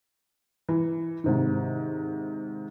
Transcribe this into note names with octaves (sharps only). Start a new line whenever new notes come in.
E3
G#2 C3 D#3